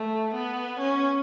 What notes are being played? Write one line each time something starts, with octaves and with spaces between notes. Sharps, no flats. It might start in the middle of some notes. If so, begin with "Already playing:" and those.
Already playing: A3
B3
C#4